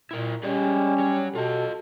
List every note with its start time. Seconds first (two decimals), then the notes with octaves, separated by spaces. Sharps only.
0.11 A#2 E4 A#4
0.43 G3 C#4 G#4 D5 D#5
0.99 F#3 C#5
1.35 B2 F4 A4 D#5